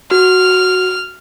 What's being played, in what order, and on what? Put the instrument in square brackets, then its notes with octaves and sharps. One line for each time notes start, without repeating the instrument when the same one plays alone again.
[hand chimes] F#4 [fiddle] F6